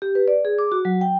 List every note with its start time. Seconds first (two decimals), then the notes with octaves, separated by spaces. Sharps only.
0.02 G4
0.15 B4
0.28 D5
0.45 G#4
0.58 D6
0.72 F#4
0.85 F#3
1.01 G5